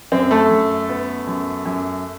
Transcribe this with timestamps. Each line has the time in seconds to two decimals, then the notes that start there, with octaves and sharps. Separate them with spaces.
0.12 F#2 C4 C5
0.31 A3 A4
0.50 F#2
0.89 B3
1.27 F#2
1.66 F#2